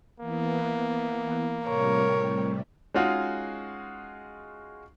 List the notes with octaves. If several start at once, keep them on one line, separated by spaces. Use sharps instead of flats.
E3 A#3 B3
A2 C3 G3 A#4 C#5
G#3 C#4 D#4 F4 F#4 G#4